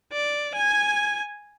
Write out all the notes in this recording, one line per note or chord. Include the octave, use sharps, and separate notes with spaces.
D5
G#5 G#6